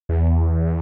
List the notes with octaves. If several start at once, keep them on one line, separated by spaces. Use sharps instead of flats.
E2